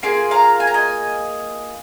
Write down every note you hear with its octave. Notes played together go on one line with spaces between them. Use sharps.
A#3 F4 G#4 G#5 C6
F5 A#5
G#5
A#5
D#5 G#5